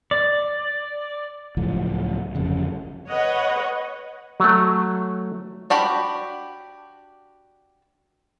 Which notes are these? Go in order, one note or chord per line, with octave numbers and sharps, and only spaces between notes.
D5
C#2 A2 F3 F#3
G1 F2 C#3 F#3
B4 C#5 D#5 F#5
F#3 A3
D4 F#4 G4 B5